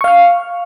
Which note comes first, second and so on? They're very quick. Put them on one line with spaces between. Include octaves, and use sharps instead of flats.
C#6 F5 F6